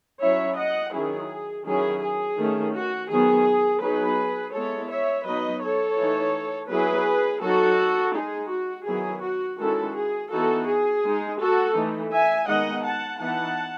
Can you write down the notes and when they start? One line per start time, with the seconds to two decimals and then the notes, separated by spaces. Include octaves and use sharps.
0.21 F#3 C#4 E4 C#5 E5
0.57 D#5 F#5
0.93 D#3 F#3 C#4 E4 G#4
1.65 D#3 F#3 C#4 E4 G#4
2.01 G#4
2.37 D#3 A3 C#4
2.73 F#4
3.10 D#3 F#3 B3 G#4
3.81 F#3 B3 D#4 G#4 B4
4.54 G#3 B3 E4 A4 C#5
4.90 C#5 E5
5.26 F#3 B3 D#4 B4 D#5
5.62 A4 C#5
5.98 E3 A3 D#4
6.70 F#3 B3 E4 G#4 B4
7.43 F#3 B3 D#4 F#4 A4
8.14 G#3 D#4 G#4
8.50 F#4
8.87 D#3 F#3 B3 E4 G#4
9.23 F#4
9.59 D#3 G#3 C#4 E4 F#4 A4
9.95 G#4
10.31 E3 B3 D#4 F#4 A4
10.67 G#4
11.03 G#3 D#4
11.39 F#4 A4
11.75 E3 A3 D#4
12.11 E5 G#5
12.47 D#3 G#3 B3 D#4 D#5 F#5
12.84 F#5 A5
13.20 E3 B3 D#4 F#5 A5